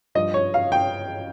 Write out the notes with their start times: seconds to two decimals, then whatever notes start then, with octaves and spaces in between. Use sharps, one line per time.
0.15 G2 F3 D#5
0.34 C#5
0.54 F5
0.72 G5